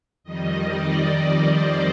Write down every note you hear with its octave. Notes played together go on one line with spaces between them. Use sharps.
F2 D#3 G3 D#5
D5
D5
C5